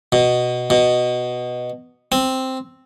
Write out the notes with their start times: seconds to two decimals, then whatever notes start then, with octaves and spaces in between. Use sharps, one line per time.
0.12 B2
0.70 B2
2.12 C4